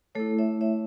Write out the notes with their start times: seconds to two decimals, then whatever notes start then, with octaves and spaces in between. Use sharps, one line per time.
0.15 A3 E4 A4 C#5
0.39 C#5 E5
0.61 C#5 E5